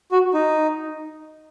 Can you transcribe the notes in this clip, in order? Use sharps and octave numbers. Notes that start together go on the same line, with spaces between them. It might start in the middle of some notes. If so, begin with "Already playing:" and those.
F#4
D#4